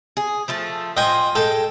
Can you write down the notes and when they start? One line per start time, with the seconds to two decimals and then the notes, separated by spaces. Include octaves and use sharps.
0.17 G#4
0.48 F3 A3 A5
0.97 F4 C5 D#5 G5 G#5
1.35 G#3 A4 G5 A5